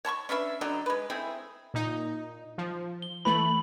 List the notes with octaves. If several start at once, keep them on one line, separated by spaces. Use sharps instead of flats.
C#5 A5 B5 C#6
C#4 D4 B4 E5
D3 F#3 D4 D#4
G#3 B4
A3 C4 E4 G#4
A#2 D#4
F3
G7
E3 A3 B5 F#7